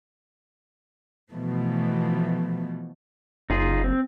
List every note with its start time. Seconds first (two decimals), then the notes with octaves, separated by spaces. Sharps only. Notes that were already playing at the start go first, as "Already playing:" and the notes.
1.30 B2 E3 F3 A3
3.50 F#1 D#4 F4 G#4
3.84 C4